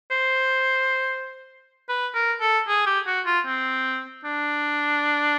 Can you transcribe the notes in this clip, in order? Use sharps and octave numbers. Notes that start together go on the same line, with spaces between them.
C5
B4
A#4
A4
G#4
G4
F#4
F4
C4
D4